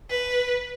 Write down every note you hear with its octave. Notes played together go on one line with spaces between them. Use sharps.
B4